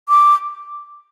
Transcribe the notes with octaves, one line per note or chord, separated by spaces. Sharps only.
D6